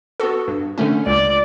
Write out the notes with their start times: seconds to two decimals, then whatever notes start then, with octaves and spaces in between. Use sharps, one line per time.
0.20 B3 F#4 A4
0.48 G2
0.78 D3 A3 C#4
1.06 C#2 D5